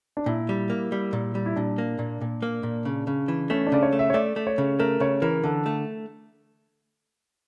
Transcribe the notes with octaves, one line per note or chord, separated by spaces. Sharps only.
D4
A#2 E4
G3
A#3
G3
A#2
G3
E4
A#2 D4
A#3
A#2
A#2
A#3
A#2
C#3
C#3
E3
A3 C#4
D4
C#3 D5
C#5
A3
E5
C#5
A3 D5
A3
C#5
C#3
A3 A#4
C#3 C#5
E3 A#4
D3 A4
A3